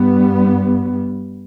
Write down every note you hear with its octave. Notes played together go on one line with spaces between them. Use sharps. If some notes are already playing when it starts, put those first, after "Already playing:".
Already playing: G2 G3 B3